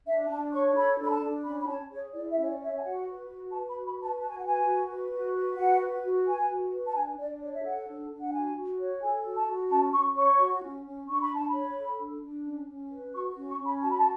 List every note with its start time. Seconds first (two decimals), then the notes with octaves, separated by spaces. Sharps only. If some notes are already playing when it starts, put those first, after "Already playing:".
0.07 D4 E5
0.30 D4 A5
0.53 C#5 C#6
0.76 A4 B5
0.99 D4 B5
1.10 A5
1.22 D4
1.44 C#4 B5
1.60 B5
1.68 C#5 A5
1.90 G#4 C#5
2.14 E4 D5
2.31 E5
2.36 C#4
2.43 C#5
2.48 D5
2.60 C#5
2.65 E5
2.78 G#5
2.83 F#4 F#5
3.06 B4
3.28 F#4
3.51 B4 A5
3.68 B5
3.75 F#4
3.85 B5
3.97 B4
4.03 A5
4.20 F#4 A5
4.29 G#5
4.38 F#5
4.43 B4 G#5
4.65 F#4
4.88 B4
5.11 F#4
5.35 B4
5.57 F#4 F#5
5.81 B4
6.04 F#4
6.26 B4 G#5
6.50 F#4
6.73 B4
6.87 A5
6.94 D4 G#5
7.18 D4 D5
7.41 C#5 D5
7.53 E5
7.63 A4 F#5
7.87 D4
8.10 D4
8.22 F#5
8.32 F#4 G#5
8.56 F#4
8.79 C#5
9.02 A4 G#5
9.25 F#4
9.35 A5
9.47 F#4
9.70 C#4 A5
9.93 C#4 C#6
10.16 C#5 C#6
10.39 F#4
10.62 C#4
10.85 C#4
11.08 D4 C#6
11.21 B5
11.31 D4 A5
11.48 B5
11.54 C#5
11.76 A4
12.00 D4
12.23 D4
12.46 C#4
12.68 C#4
12.91 B4
13.14 F#4 C#6
13.36 C#4
13.49 C#6
13.60 C#4
13.66 B5
13.82 F#4 A5
13.90 B5
13.98 A5